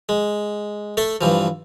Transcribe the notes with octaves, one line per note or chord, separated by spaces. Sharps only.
G#3
A3 A4 E5
G2 E3 F3